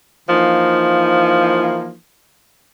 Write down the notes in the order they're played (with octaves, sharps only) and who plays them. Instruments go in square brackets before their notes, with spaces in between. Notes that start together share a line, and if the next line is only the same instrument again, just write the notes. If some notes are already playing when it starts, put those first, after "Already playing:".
[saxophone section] E3 F3 A#3 D#4